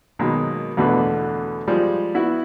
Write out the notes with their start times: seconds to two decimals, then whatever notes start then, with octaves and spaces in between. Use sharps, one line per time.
0.19 B2 D#3 F#3 G#3 A#3
0.77 E2 B2 D3 A3 B4
1.68 F3 G3 G#3
2.14 B3 E4 F#4